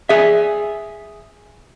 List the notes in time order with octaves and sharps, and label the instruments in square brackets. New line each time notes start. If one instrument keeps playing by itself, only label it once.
[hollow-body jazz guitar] G#4 E5